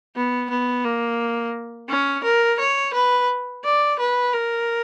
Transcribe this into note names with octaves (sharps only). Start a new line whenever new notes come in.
B3
B3
A#3
C#4
A#4
C#5
B4
D5
B4
A#4